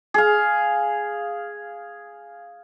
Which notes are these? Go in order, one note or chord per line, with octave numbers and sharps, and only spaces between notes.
G#4 F5